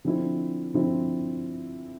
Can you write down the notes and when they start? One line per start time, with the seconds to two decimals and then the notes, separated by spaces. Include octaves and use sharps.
0.04 D3 F3 C4 E4
0.74 D3 F3 C4 E4